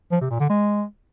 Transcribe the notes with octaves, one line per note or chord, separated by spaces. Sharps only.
F3
C3
A#2
D3
G#3